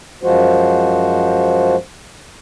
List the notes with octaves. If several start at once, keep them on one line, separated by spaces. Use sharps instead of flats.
F#2 F3 G#3 F#4 C5